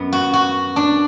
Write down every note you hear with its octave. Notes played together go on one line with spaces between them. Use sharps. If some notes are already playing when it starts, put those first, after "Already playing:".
Already playing: F#2 B3
F#4
F#4
D4